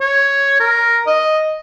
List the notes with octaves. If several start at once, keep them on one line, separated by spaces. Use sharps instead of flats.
C#5
A#4
D#5